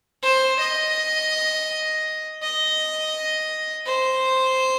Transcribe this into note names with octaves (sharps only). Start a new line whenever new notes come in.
C5
D#5
D#5
C5